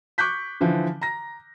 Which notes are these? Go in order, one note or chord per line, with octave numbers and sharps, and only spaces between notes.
C#6 D6 F#6 G6 B6
D3 E3 F3
A#5 A#6